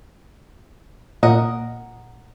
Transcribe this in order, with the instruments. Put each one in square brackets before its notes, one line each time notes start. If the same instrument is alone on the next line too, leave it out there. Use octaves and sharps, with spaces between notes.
[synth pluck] A#2 [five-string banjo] A#4 D#5 F#5